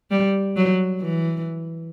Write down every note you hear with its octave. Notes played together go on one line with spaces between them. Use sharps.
G3
F#3
E3